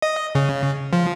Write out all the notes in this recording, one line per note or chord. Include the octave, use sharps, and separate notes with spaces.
D#5
C#3
F3